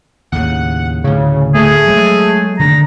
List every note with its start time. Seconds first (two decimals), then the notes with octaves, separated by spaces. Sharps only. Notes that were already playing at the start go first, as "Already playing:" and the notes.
0.32 D#2 A2 C#3 F#5
1.04 D2 A2 C#3
1.55 A3 G#4
1.87 F#3 G#3
2.59 D3 D#3 D4 A#5